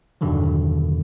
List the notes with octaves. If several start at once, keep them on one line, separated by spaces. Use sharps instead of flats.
E2 G2 B2 D3 D#3 F#3